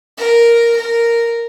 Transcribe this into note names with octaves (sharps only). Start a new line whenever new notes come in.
A#4
A#4